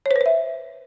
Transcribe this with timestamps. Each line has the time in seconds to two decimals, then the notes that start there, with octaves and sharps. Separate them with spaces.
0.06 C#5
0.11 C5
0.16 B4
0.21 C5
0.26 E5